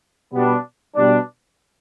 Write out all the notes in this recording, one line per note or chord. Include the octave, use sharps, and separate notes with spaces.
B2 G3 B3 D4
B2 G3 D4